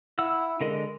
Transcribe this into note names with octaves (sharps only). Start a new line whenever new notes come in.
E4 F#5 E6
D3 G#3 A#4 D#5